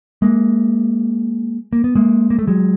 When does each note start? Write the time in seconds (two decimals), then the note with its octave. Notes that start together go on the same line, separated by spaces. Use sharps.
0.22 G#3 A#3
1.73 A#3
1.84 B3
1.95 G#3 A#3
2.30 A#3
2.39 A3
2.47 F#3 G#3